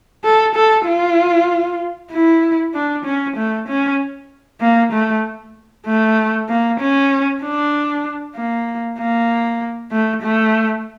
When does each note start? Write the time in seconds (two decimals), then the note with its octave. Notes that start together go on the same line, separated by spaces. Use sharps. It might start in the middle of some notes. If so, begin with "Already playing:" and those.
0.24 A4
0.55 A4
0.86 F4
2.12 E4
2.74 D4
3.05 C#4
3.37 A3
3.68 C#4
4.61 A#3
4.93 A3
5.87 A3
6.49 A#3
6.80 C#4
7.43 D4
8.36 A#3
8.99 A#3
9.92 A3
10.23 A3